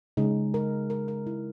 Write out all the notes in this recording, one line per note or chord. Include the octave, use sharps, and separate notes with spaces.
C#3 G#3 D#4
A#4
A#4
A#4
E4